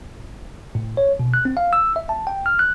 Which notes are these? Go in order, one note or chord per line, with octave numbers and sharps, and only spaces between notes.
A2
C#5
B2
F#6
C4
F5
E6
E5
A5
G5
F6
F#6